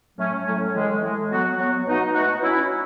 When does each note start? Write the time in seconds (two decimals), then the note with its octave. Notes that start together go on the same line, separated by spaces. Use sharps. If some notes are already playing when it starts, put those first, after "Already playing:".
0.18 A2 F#3 A3 C#4
0.46 A2 F#3 A3 C#4
0.74 A2 E3 G#3
1.02 A2 E3 G#3
1.31 F#3 B3 F#4
1.58 F#3 B3 F#4
1.87 B2 A3 D#4 F#4
2.14 B2 A3 D#4 F#4
2.42 F#3 C#4 E4